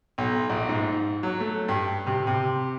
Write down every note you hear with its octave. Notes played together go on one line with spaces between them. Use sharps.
B1
A#1
G#2
F#3
A3
G2
C3
C3